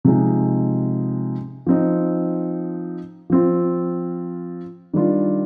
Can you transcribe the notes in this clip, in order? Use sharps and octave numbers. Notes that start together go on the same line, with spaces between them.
C3 F3 G#3 D#4
F3 C4 D#4
F3 C4 F4
D#3 G3 D4 F4